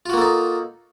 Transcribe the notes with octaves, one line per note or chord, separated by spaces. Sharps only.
A#3 D#4 F4 F#4 A4